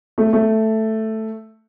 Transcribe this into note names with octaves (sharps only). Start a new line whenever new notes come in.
A3
A3